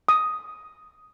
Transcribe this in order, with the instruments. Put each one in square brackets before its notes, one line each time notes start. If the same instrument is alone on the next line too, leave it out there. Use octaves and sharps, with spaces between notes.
[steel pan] D#6